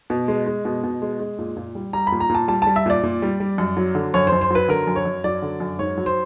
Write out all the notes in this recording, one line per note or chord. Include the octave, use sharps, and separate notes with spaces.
B2
G#3
G#3
B2
B2
G#3
G#3
A#2
A#2
G3
G3 A#5
B5
A#2
A#5
A#2
A5
G3 A5
G3 A5
E5
A#2 D5
A#2
G3
G3
F#2
F#3
D3
F#2 C#5
C5
F#2
C5
F#3 B4
D3 A#4
F#2
C#5
F#2
F#3 D5
D3
F#2
G#2 C#5
F#3
C5